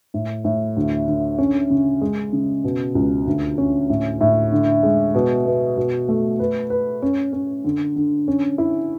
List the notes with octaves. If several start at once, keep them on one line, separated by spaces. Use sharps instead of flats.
A2
A2
D2
D3
C#4
C#3
G#3
C#3
B2
C#2
D2
C#4
A2
A2
D3
G#3
B2
B3
B2
A3
B4
B4
C#4
C#4
D3
D3
C#4
E4